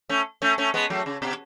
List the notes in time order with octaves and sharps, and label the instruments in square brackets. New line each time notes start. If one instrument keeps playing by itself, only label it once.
[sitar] A3 C#4
A3 C#4
A3 C#4
G#3 B3
F#3 A3
C#3
B2